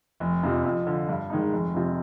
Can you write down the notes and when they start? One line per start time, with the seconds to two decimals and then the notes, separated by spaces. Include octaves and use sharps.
0.20 F1
0.43 F2 C3
0.64 F2
0.87 D3 F3
1.09 G2
1.30 D#3 G#3 D#4
1.53 F1
1.74 F2 C3